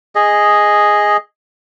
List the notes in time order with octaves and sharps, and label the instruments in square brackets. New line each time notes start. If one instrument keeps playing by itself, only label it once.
[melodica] G#4 D#5